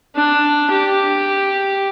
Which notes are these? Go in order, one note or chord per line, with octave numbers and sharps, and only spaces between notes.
D4
G4